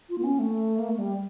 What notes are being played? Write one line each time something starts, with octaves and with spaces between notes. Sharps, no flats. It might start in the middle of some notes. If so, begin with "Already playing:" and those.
F4
A#3
C#4
A3
A#3
A3
G3